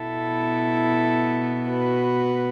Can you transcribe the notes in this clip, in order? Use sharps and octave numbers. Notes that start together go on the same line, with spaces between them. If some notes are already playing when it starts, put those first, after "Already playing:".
Already playing: B2 B3 E4 A4
F#4 B4